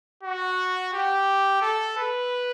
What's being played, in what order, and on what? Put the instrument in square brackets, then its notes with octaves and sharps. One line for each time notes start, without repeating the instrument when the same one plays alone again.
[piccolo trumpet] F#4
G4
A4
B4